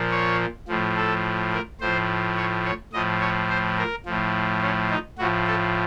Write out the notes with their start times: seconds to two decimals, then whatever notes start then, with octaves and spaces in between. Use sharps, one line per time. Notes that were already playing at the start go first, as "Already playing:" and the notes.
Already playing: A#2 F3
0.12 C#5
0.68 A2 F3
0.97 A4
1.52 A#4
1.80 A2 F3 C5
2.37 C#5
2.65 C#5
2.93 A2 F3 D#5
3.21 C#5
3.50 C5
3.78 A#4
4.06 A2 F3
4.62 C#4
4.90 D#4
5.18 A2 F3 F#4
5.47 A4